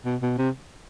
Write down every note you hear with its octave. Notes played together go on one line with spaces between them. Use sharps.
B2
B2
C3